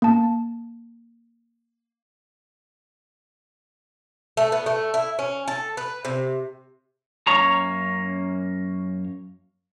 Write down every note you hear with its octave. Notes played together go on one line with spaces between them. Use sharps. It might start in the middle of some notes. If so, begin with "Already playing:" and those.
A#3 A5
A3
B3
A3
E4
C#4
A4
B4
C3
F#2 A#3 C#4 C#5 A#5